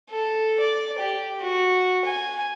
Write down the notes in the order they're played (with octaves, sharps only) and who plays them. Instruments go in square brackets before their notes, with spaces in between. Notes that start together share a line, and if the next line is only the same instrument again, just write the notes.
[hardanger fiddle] A4
D5
G4
F#4
G#5